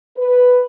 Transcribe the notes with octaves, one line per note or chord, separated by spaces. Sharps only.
B4